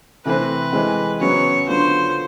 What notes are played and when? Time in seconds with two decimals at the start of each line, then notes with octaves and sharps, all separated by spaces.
0.25 C3 E3 A3 C4 B4
0.73 E3 G#3 C4
1.20 C#3 F#3 B3 C#5
1.68 D3 F#3 B3 D4 F4 C5